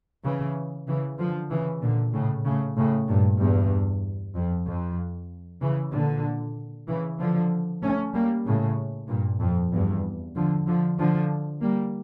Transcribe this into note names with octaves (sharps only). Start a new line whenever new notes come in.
C#3 E3
C#3 E3
D3 F3
C#3 E3
A#2 D3
A2 C#3
A2 C#3
A2 C#3
G2 A#2
E2 G2
F2
F2
C#3 E3
A#2 D3
C#3 E3
D3 F3
A3 C#4
G3 A#3
A2 C#3
G2 A#2
F2
E2 G2
D3 F3
D3 F3
D3 F3
G3 A#3